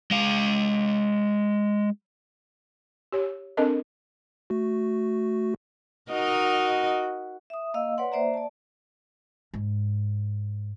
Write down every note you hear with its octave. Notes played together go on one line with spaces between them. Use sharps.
G#3 F5
G4 C#5
C4 D4 A4 A#4 D#5 A5
A3 F#4
D#4 F#4 A#4 D#5
E5 D#6
A#3 D#5 F5 E6
B4 C#5 D5 F#5 C6
A#3 C5 D5 E5 A#5
D5 A5
G#2